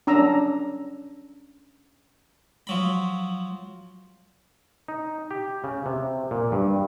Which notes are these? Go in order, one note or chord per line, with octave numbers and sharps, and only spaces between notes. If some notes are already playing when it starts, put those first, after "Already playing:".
C#4 D4 A#5 E6
F3 F#3 B5
D#4
G4
C#3
C3
A#2
G2